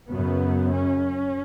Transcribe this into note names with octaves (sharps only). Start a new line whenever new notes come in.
F#2 C#3 B3
C#4